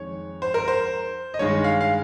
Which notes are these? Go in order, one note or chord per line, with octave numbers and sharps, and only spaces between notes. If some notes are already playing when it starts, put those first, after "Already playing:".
Already playing: F2 D#3 G#3 C#5
C5
A#4
C5
D#5
G2 D#3 G#3 C#5
F5
F5